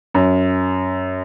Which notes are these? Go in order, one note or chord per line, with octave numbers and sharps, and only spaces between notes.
F#2